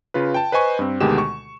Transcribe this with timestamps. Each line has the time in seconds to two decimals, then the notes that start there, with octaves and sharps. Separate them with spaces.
0.14 C#3 F4 B4
0.34 G5 A5
0.52 B4 C5 D#5 G#5 C#6
0.79 G2 C4
1.00 D2 B2 D#3 G#3 G4 E7
1.18 C#6